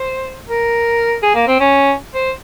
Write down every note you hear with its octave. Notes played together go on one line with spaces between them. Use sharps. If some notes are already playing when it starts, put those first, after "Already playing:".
Already playing: C5
A#4
G#4
A#3
C4
C#4
C5